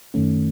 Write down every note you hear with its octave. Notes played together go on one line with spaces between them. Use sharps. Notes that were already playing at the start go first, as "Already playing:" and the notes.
F#2 D#3 A3 C#4